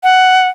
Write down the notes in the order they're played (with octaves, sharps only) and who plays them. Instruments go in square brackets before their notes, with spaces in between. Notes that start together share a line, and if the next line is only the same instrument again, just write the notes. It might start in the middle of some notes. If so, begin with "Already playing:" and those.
[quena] F#5